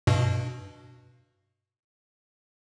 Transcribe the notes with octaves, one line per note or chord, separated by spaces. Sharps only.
G2 B2